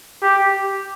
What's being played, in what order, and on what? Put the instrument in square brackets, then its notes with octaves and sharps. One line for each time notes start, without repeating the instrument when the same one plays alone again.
[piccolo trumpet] G4